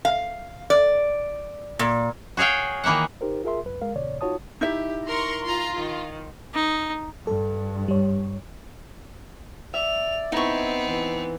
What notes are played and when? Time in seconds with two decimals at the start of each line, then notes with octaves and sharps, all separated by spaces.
0.05 F5
0.70 D5
1.79 A#2
2.37 F#4 G#4 C#5 F5 G5
2.84 D#3 E3 A#3 E5 F#5
3.21 D#4 G4 A#4 C5
3.44 F4 G#4 A#4 E5 C6
3.65 C2 F#2 B4
3.82 G#3 A#4 F5
3.96 E2 A#2 C#3 C#5 D5
4.21 D#4 F4 F#4 C#5 A5 D#6
4.61 D#4 E4 G4 E5
5.07 A#4 A#5 C6 C#6
5.44 F4 A#5 C6
5.76 D#3
6.54 D#4
7.27 G2 A4
7.88 G3 C#5
9.74 D5 E5 F7
10.32 B3 C4 D#4 E4 C#6
10.88 E3